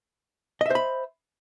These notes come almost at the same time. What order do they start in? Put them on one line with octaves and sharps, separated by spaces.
D#5 E5 C5 B5